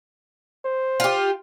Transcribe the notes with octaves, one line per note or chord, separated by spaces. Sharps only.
C5
F4 G4